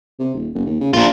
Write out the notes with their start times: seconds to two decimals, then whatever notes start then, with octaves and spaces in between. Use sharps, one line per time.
0.19 C3
0.34 D#1
0.55 F#1
0.66 D#2
0.81 C#3
0.93 A#1 D4 F4